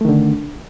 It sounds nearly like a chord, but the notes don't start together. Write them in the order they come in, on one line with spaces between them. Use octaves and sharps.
A3 D#3 D3